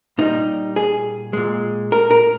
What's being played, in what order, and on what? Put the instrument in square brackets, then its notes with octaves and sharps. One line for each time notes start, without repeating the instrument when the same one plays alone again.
[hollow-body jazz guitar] A#2 G3 D#4
G#4
A#2 G#3
A#4
A#4